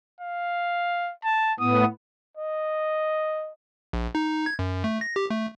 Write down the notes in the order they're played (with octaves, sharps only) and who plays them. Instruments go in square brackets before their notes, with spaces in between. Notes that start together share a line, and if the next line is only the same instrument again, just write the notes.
[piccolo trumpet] F5
A5
[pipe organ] A2 B3 [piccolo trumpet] D#6
[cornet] D#5
[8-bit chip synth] A#1
D#4
G#6
F#2
A3
A#6
G4
A3